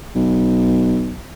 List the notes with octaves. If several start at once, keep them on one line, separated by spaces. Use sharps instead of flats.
B1